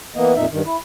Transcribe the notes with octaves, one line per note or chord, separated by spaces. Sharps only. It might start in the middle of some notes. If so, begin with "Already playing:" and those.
E3 A#3 B3 D#5
F2 A#2 D#4 E5
G2 D#3
E4